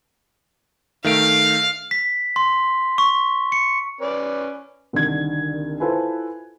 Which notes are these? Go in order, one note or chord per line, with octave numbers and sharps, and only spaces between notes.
D#3 A3 F5 D7
B6
C6
C#6
C#7
C#4 B4 D5
C2 D3 D#3 G#6
E4 F4 A4 B4 C5 G#5